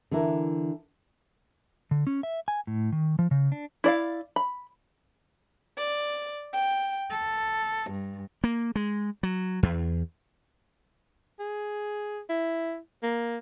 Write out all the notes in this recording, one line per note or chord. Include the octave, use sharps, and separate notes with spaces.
D3 E3 E4 A#4
D3
C#4
E5
G#5
A2
D#3
F3
C#3
D4
E4 D5 F5
B5
D5
G5
A4
G2
A#3
G#3
F#3
E2
G#4
E4
A#3